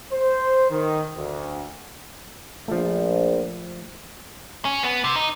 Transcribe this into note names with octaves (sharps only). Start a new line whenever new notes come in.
C5
D#3
D2
A#1 F3 A3
C#4
B3
C3
D#4